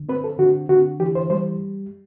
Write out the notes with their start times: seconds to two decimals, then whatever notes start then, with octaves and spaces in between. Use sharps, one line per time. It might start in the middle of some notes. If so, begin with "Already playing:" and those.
Already playing: D3
0.09 C4 B4
0.24 A4
0.39 D3 F#4
0.69 D3 F#4
1.00 E3 G4
1.15 C5
1.30 G3 C5